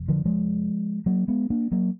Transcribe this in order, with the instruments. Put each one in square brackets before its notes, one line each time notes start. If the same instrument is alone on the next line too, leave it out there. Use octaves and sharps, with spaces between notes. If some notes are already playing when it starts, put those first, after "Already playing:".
Already playing: [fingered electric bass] F1 F2
D3 F3
F3 G#3
F#3 A#3
G#3 B3
A#3 D4
F#3 A#3